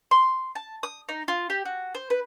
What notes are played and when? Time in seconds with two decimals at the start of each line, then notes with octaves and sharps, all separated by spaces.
0.11 C6
0.55 A5
0.83 D#6
1.09 D#4
1.28 F4
1.50 G4
1.65 F#4
1.95 C5
2.10 B4